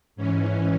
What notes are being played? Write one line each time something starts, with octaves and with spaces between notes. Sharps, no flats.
G#2 E3 C#4